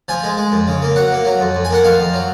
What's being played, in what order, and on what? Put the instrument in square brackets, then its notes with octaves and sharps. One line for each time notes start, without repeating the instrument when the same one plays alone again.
[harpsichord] F3 G#5
G#3
G#3
F2
C#3
A#3
F#3 F#5
A#3
F#3
F2
F2
G#5
A#3 F#5
F2 F5
F2
F#3